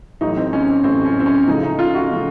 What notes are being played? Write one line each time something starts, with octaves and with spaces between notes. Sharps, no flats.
A1 A2 F#3 D#4
C4
C#4
C4
A1 A2 F#3 C4
C#4
C4
C#4
C#2 C#3 F3 A3 D#4
D#4
F4
F#4
C#3 F3 A3